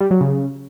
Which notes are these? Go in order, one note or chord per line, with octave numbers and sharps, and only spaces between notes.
G3
F#3
C#3